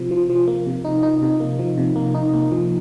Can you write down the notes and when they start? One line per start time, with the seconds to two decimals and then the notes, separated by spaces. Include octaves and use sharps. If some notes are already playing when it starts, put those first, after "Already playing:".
Already playing: C3 F3
0.11 F3
0.30 F3
0.48 A#3
0.67 C3
0.85 D#4
1.03 D#4
1.22 C3
1.40 A#3
1.59 F3
1.78 C3
1.96 A#3
2.15 D#4
2.34 A#3
2.51 F3